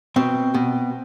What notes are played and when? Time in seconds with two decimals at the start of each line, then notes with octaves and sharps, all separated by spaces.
0.16 B2 C4
0.54 B2